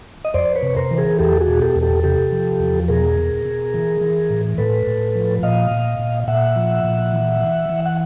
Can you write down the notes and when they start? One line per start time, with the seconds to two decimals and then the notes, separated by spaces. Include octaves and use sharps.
0.25 D#5
0.34 F2 C5 D5
0.55 B4 C#5
0.62 C3
0.76 A#4 C5
0.91 E3
0.97 G#4 A#4
1.19 E2 G4 A4
1.40 F#4 G#4
1.48 B2
1.61 G4 A4
1.76 E2
1.82 G4 A4
2.04 C3 G4 A4
2.32 F3
2.60 E2
2.88 B2 G#4 A#4
3.17 B2
3.45 B2
3.74 E3
4.01 E3
4.30 A2
4.58 A2 A4 B4
4.87 A2
5.15 F3
5.43 A#2 D#5 F5
5.71 A#2
5.99 A#2
6.28 A#2 E5 F#5
6.56 F3
6.85 A#2
7.12 E3
7.41 E3
7.69 E3
7.86 F#5